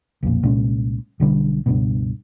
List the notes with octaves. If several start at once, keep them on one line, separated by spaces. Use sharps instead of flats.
B1 F2 A#2
C2 A#2 G#3 C#4
B1 D3 G3
C#2 G2 B2